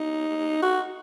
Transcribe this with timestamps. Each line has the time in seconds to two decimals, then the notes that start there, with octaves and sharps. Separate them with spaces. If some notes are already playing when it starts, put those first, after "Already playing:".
Already playing: D#4
0.62 F#4